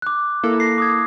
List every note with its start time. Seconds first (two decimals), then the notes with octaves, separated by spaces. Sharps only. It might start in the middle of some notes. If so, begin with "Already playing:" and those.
0.02 D6 F#6
0.43 A#3 E4 A4
0.60 A#6 C7
0.78 D6 D#6 G#6